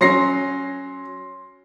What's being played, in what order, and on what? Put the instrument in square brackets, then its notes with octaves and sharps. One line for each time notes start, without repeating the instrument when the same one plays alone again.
[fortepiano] F#3 C#4 [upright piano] C6 A#6 C7